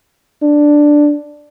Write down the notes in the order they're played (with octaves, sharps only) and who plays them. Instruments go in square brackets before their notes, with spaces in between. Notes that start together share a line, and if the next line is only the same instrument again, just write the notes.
[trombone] D4